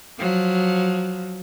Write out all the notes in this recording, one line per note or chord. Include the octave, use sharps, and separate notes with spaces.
F3 F#3